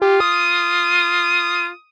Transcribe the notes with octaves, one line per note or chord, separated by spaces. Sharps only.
F4 G4
D#6